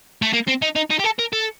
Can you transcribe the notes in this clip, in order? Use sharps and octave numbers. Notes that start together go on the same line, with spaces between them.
A3
A#3
C4
D#4
D#4
D#4
G4
A4
A#4
A4